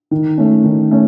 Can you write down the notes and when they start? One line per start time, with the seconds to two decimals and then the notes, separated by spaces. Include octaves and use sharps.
0.11 D#3
0.38 A3 C#4
0.64 D#3
0.91 A3 C#4